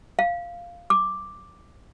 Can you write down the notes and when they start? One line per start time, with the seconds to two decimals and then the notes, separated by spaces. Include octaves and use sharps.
0.19 F5
0.90 D6